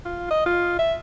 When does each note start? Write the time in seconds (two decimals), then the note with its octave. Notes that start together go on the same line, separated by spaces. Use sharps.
0.05 F4
0.30 D#5
0.46 F4
0.79 E5